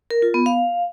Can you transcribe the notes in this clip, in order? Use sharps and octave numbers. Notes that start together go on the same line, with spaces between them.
A#4
F4
B3
F5